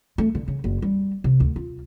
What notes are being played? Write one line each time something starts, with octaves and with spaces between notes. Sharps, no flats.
A3
D3
C#3
F#1
G3
C3
D2
F4